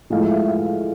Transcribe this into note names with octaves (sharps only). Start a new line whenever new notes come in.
A2 F3 G#3 F5
E5
E5
F5